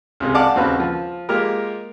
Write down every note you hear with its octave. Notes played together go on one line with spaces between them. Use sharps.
C#2 C3 G#3
D5 F5 F#5 A5 D6
D#2 C#3 C4 F#4 B4
F3
G#3 A#3 F4 G4 A#4